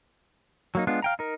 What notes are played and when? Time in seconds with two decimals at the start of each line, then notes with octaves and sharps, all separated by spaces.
0.75 F#3 A#3 D#4
0.87 G#3 B3 D4 F4
1.02 F5 G5 A#5
1.19 D#4 A#4